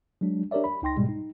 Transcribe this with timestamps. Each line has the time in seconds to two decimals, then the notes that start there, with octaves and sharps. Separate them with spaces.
0.21 F#3 G#3 D4
0.51 D4 G4 A#4 C#5 D5 E5
0.64 B5
0.82 C#2 D#4 G5 C6 A#6
0.96 G#2 B2 G3 G#3
1.09 D#4